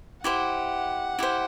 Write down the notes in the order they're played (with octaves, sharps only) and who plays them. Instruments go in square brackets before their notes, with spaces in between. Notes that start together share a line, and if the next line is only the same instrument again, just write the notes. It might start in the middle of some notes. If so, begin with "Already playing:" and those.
[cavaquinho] E4 G4 C5 [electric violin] F#5
[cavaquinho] E4 G4 C5